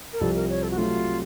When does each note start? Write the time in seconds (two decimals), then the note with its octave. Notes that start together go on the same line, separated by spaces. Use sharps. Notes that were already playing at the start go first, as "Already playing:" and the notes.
0.13 A#4
0.20 C2 C3 F3 A4
0.35 A#4
0.49 C#5
0.63 A4
0.71 F#4
0.77 C3 F#3 A3 F4